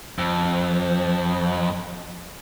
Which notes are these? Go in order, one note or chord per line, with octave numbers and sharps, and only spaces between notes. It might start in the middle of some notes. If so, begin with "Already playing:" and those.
F2